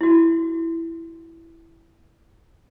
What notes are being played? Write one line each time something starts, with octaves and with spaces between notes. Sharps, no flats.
E4 F#4